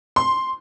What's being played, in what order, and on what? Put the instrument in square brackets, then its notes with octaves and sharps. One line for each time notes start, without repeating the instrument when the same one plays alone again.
[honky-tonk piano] C6